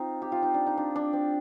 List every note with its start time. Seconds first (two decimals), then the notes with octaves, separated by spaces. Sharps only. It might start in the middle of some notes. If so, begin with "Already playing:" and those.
Already playing: C4 D#4 F4
0.22 G4
0.32 F4
0.42 D#4
0.54 D4
0.67 D#4
0.77 D4
0.96 D4
1.13 C4